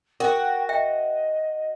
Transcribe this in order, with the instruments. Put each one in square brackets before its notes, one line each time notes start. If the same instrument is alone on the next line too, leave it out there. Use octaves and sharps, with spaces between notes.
[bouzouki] F#4 [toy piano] A#4 [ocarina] G5
[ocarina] D#5 [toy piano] E5 G5